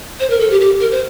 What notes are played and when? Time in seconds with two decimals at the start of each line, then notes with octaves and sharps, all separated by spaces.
0.20 C5
0.30 A#4
0.40 A4
0.50 G4
0.61 G4
0.81 A#4
0.91 C5